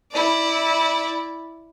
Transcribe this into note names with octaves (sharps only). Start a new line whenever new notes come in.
E4 D5